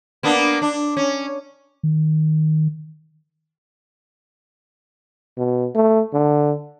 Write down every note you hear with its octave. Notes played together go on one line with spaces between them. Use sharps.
A#3 B3 D4
D4
C#4
D#3
B2
A3
D3